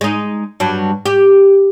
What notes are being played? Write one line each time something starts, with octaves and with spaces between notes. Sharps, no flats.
G#3 D#4
G2 F#3
G4